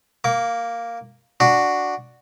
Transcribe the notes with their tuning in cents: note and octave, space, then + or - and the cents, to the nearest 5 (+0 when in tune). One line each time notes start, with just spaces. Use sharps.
A#3 +0 D6 -35
D4 +0 F#4 +0